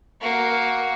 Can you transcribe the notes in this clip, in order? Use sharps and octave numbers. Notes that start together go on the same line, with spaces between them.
A#3 F#4